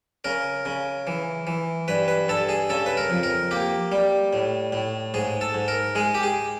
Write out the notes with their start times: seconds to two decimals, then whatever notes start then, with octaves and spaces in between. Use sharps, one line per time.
0.24 C#3 A#4
0.65 C#3
1.07 E3
1.47 E3
1.88 G2 B4
2.08 B4
2.28 G2 A4
2.49 G#4
2.69 C#3 A4
2.86 B4
2.97 A#4
3.10 F2
3.23 A#4
3.51 A#3 G4
3.92 G3
4.33 A2
4.73 A2
5.14 G#2 G#4
5.41 A4
5.54 G#2
5.68 A#4
5.95 G#3 G#4
6.15 G4
6.23 G#4